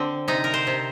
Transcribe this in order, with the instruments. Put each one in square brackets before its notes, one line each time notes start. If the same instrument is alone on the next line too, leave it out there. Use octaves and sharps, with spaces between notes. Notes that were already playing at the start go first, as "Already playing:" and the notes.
Already playing: [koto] D3 C4
C3 D#4
A#4
C5
C3